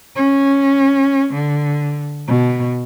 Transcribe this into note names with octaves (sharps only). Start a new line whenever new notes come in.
C#4
D3
B2